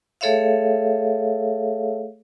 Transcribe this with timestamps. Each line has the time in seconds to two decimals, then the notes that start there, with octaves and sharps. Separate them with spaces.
0.21 A3 G#4 A4 C#5 E5 F5